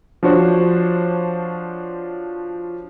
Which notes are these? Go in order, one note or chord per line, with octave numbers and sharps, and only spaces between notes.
F3 D4 F#4 C5 C#5